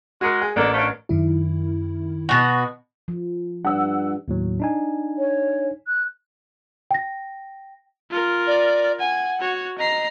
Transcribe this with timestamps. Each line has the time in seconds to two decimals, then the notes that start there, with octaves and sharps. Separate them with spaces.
0.21 G#3 F#4 A#4 C#7
0.41 G#4
0.56 A1 A#3 D4 A4 A#4
0.74 A3 C#4 D4
1.09 F#2 D#3 E4
2.29 B2 F#4
3.08 F3
3.65 G2 F#5 E6
4.28 D#2 A2 F#3
4.60 D4 D#4 G#5
5.18 C#5
5.88 F#6
6.91 G5 A#6
8.11 F4 A#4
8.47 D5
9.00 F#5 G#5
9.40 F#4 C#5
9.78 D#5 A#5 C7